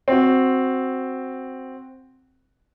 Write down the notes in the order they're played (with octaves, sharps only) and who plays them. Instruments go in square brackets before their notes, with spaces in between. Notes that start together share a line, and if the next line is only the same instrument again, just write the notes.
[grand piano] C4 F#4